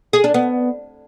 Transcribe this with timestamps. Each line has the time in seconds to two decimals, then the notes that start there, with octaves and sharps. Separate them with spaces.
0.13 G#4
0.24 D4
0.34 B3